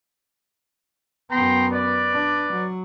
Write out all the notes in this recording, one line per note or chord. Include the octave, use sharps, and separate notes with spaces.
F#2 B3 G5 A#5 C6
B4 D5
D4
F#3